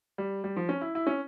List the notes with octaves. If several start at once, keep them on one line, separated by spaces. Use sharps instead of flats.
G3
G3
F3
C#4
E4
E4
C#4